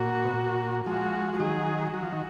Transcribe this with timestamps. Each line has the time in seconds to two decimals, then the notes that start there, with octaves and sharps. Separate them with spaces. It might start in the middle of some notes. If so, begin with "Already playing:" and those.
Already playing: A#2 F#4
0.24 B2
0.33 A#2
0.86 F3 G#3 F#4
1.33 F3
1.40 D#3 F#3 G#4
1.93 F#3 F#4
2.03 F3
2.13 D#3